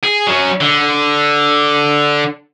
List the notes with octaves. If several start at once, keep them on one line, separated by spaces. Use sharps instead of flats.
G#4
F#3 C#4
D3